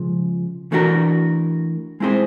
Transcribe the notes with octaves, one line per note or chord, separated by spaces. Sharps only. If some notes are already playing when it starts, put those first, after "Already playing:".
Already playing: C#3 F3 G#3
E3 A3 D4 F#4 A#4
G#3 C4 E4 G#4 C5